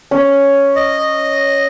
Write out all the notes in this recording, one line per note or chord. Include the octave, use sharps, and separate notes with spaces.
C#4
D#5